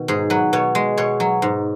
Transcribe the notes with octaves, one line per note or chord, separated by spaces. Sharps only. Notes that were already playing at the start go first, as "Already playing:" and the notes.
Already playing: B2 D#3
G#2 G#4
F#3 B4
B2 C#5
G#3
B2 C#5
F#3
G#2